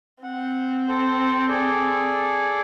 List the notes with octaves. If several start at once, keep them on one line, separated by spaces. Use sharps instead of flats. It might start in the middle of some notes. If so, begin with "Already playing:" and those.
C4 F#5
A4 C5
G#4 A4 D5